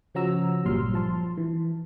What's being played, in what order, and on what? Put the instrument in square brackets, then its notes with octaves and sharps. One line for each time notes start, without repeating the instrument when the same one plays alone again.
[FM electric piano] C#3 F3 C#4 F#4 A#5 E6
G1 A#2 F#3 G3 C6 F6
F3 A5 C6
E3